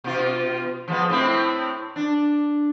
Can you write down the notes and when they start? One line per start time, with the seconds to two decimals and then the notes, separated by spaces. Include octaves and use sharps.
0.04 B2 F4
0.88 F3 G#3 B3
1.10 A2 C4 E4
1.96 D4